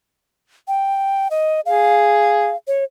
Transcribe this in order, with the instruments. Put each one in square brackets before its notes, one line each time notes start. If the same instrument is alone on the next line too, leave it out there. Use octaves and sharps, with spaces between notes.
[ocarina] G5
D#5
[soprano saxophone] G#4 [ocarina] F5
[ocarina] C#5